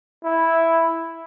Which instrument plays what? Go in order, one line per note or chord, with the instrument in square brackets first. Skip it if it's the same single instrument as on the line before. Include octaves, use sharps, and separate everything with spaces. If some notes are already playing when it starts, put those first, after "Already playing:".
[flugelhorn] E4